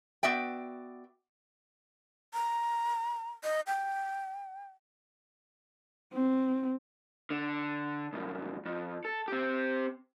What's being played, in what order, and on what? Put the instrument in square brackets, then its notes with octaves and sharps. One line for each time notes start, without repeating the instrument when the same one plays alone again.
[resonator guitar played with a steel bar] B3 F#4 D5 E5 G5
[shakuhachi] A#5
D#5
G5
[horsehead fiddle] C4
[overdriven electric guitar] D3
C2 F#2
F2
A4
C4 G4